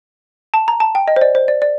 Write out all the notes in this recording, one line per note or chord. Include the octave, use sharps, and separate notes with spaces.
A5
A#5
A5
G5
D#5
C5
D5
C5
D5
D5